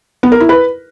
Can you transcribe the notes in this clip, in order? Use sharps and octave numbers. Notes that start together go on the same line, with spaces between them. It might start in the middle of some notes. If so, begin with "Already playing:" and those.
B3
A#4
E4
B4